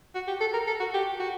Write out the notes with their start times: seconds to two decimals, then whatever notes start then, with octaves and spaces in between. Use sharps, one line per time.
0.15 F#4
0.27 G4
0.40 A4
0.53 A#4
0.67 A4
0.80 F#4
0.94 G4
1.20 F#4